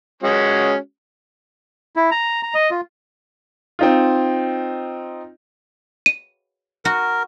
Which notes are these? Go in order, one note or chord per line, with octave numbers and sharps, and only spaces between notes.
G#3 C#4 F#4
E4
A#5
A#5
D#5
F4
C4 D#4 F4
D#7
F#4 A#4